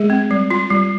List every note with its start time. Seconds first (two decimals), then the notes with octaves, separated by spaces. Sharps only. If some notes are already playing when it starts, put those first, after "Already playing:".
Already playing: G#3 G#4
0.10 C4
0.31 G3
0.50 F4
0.70 G3